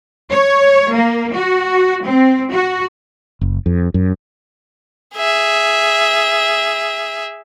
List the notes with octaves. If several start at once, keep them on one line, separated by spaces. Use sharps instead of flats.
C#5
A#3
F#4
C4
F#4
F#1
F2
F#2
G#4 E5